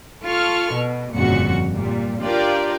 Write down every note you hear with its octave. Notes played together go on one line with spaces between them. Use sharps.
F4 A4 C#6 F6
B2
G1 F2 A#2 C#3 F#4 C#7
A#2 G3
D4 F4 G4 A#4 D5